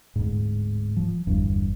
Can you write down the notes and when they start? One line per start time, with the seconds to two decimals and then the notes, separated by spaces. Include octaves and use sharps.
0.16 D1 G#2
0.96 F3
1.27 G1 E2 G2